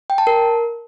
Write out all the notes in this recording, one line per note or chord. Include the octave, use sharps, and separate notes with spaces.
G5
A5
A#4